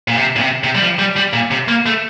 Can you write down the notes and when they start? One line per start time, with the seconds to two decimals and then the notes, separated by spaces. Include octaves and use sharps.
0.08 A#2
0.17 C3
0.36 A#2
0.40 C3
0.64 C3
0.75 G3
0.81 F3
0.99 G3
1.16 G3
1.33 A#2
1.51 C3
1.68 A#3
1.86 A3